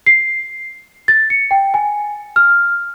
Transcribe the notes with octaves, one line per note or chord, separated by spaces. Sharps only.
C7
A6
C#7
G5
G#5
F6